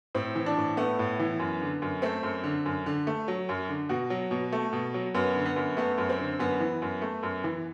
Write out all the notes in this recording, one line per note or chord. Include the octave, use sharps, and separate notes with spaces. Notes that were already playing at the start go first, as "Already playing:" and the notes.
A2 C4
E3
D4
A2
A3 B3
A2
E3
F#2
D3
F#2
A3 C4
F#2
D3
F#2
D3
A3
F#3
F#2
D3
B2 F#4
F#3
B2
A3
B2
F#3
F#2 B3
D3
B3
F#2
A3 B3
F#2
C4
D3
F#2 B3
E3
F#2
A3
F#2
E3